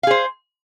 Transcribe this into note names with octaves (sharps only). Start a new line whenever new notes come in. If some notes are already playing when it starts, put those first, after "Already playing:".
G#4 C5 F5